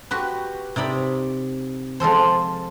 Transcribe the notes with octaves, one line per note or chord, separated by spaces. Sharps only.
F#4 G4 B4
C3 D#4 D5 B5
F3 G#3 A4 C5